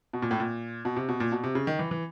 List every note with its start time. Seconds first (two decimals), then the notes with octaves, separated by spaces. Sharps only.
0.13 B2
0.22 A#2
0.31 A2
0.40 A#2
0.85 B2
0.96 C3
1.09 B2
1.20 A#2
1.32 B2
1.44 C3
1.55 C#3
1.67 D#3
1.79 E3
1.91 E3